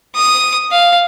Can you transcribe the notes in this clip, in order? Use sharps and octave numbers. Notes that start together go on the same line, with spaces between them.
D#6
F5